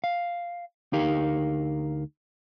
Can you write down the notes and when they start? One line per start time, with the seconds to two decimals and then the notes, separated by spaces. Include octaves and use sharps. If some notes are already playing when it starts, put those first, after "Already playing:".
0.04 F5
0.93 D2 D#4 G4 A#4 F5